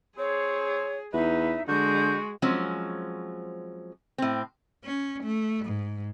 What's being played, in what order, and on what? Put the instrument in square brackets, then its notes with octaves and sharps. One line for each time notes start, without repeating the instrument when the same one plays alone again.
[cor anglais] C4 [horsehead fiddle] G#4 [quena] C#5
[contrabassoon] E2 [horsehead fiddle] D#4 [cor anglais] B4 [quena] E5
[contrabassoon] D3 [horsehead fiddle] G#3 [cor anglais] F#4 [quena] G6
[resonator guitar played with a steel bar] F3 F#3 G#3 C4 C#4
A2 C4
[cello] C#4
A3
G#2